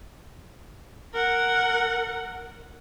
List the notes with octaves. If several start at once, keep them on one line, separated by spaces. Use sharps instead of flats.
A#4 F#5